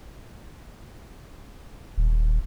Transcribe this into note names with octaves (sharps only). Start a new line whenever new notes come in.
D#1